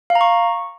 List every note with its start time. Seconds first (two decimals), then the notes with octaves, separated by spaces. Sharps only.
0.10 F5
0.15 A#5
0.21 C#6